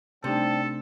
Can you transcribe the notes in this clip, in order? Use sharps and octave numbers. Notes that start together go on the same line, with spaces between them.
C3 G3 A3 C4 D4 D#4 A4 A5